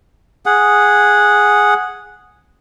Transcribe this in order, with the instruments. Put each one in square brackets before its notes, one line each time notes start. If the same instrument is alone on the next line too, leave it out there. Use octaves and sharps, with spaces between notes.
[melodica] G#4 F#5